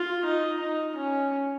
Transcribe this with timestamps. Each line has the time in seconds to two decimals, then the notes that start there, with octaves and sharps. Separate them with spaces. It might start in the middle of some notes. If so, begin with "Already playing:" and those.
Already playing: F4
0.25 D#4
0.60 D#4
0.96 C#4